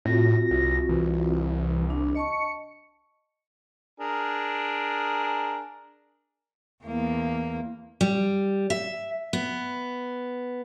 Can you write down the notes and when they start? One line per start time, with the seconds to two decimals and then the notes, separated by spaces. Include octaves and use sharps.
0.05 A2 C4 F4 F#4 A#6
0.51 C2
0.89 C2 E3
1.90 D4
2.15 D#5 A5 C#6 C#7
4.00 D4 G#4 A#4
6.85 E2 A#3
8.01 G3
8.70 E5
9.33 B3